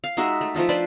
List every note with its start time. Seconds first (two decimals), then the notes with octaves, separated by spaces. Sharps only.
0.04 F5
0.17 G#3 D#4 F#4 E5
0.41 A3
0.55 F3 A3 D#4 F4
0.69 D4 B4 C5 D5